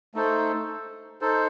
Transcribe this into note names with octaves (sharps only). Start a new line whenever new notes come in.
A3 D#4 A4 C5
D#4 A4 C5